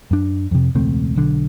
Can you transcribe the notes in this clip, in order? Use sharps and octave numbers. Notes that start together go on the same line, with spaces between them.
F#2 D4
F2 C3
E1 C#2 A3 C4
B1 D3